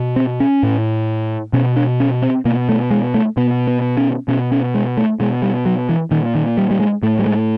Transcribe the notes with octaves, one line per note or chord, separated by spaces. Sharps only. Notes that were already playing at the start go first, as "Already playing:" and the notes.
Already playing: B2
C4
C#4
A2
B2 C#4
D4
C#4
C4
B2 A#3
A3
G#3
A3
B2 B3
B3
C#4
B2 C#4
C#4
G#3
A3
B2 G#3
G3
F#3
E3
A#2 D#3
D#3
G3
G3
G#3
A2 A3
G3
G#3